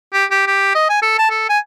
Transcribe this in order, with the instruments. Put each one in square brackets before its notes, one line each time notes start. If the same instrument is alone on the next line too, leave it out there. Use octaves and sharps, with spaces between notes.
[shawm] G4
G4
G4
D#5
G#5
A4
A5
A4
G#5